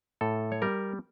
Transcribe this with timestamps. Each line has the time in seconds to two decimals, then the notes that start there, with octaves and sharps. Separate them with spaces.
0.21 A2 A4
0.52 C#5
0.62 G3 A#4